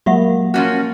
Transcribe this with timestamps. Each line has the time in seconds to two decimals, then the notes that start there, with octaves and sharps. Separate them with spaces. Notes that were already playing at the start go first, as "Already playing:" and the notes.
0.06 F#3 G#3 A#3 G4 E5 F#5 B5
0.54 F3 C#4 F#4 F6